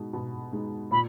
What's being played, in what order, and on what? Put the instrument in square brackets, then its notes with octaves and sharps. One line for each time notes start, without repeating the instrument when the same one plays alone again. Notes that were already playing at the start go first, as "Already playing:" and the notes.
Already playing: [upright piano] B2 G#3 D#4
B2
G#3 D#4
[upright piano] A#2 [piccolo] B5